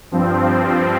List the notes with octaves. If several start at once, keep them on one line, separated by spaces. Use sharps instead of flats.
G2 F3 C4